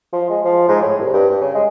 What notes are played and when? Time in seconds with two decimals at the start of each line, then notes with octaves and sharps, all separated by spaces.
0.13 F3
0.30 G#3
0.44 F3
0.68 G#2
0.82 A2
0.99 C2
1.13 G2
1.29 G2
1.41 C#3
1.54 G#3